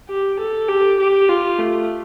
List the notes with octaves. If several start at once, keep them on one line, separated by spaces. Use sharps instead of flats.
G4
A4
G4
G4
F4
A3